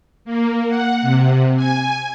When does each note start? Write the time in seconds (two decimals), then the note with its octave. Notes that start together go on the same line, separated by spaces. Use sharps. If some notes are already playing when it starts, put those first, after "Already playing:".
0.25 A#3
0.68 F#5
1.02 C3
1.56 G#5